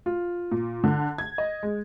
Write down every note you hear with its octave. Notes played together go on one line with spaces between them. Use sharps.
F4
A#2
D3
G#6
D#5
G#3